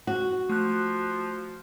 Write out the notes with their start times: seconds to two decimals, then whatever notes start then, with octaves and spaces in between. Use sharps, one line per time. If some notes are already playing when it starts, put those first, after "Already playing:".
0.07 F#4
0.49 F3 A3 F#6